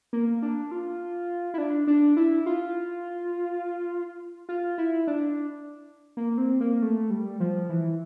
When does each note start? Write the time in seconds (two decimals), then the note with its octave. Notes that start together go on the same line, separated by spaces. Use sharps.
0.13 A#3
0.42 D4
0.71 F4
1.54 E4
1.58 D4
1.87 D4
2.17 E4
2.46 F4
4.49 F4
4.78 E4
5.07 D4
6.17 A#3
6.38 C4
6.60 A#3
6.82 A3
7.10 G3
7.40 F3
7.69 E3